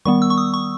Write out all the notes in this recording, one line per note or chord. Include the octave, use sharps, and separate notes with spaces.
D#3 G3 B3 C#6
E6
C#6
D#6
C#6